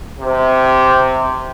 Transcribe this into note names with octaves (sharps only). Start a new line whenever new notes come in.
C3